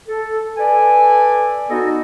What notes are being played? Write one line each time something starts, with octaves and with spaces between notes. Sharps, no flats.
A4
A4 B4 D5 G#5
B3 D#4 F#4 A4 D#5